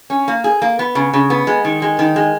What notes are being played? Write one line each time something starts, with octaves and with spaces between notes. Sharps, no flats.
C#4
A#3
G#4
A#3
B3
C#3
C#3
B3
G#3
D#3
G#3
D#3
G#3